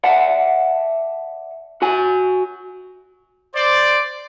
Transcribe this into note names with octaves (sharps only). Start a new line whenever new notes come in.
D5 E5 F#5 A5
F#4 G#5
C5 D5